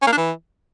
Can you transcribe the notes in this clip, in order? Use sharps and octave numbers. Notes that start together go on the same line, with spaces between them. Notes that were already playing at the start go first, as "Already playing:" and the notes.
C#4
A#3
D4
E3